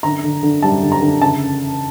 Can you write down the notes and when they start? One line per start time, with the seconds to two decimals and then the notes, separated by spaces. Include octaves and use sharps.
0.03 D3 A#5
0.24 D3
0.43 D3
0.63 G3 A5
0.82 D3
0.92 A#5
1.02 D3
1.21 C#3 A5